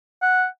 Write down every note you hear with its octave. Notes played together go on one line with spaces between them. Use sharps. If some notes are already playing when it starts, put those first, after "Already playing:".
F#5